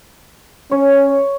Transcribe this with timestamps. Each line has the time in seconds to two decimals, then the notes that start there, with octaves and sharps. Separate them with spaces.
0.71 C#4 C#5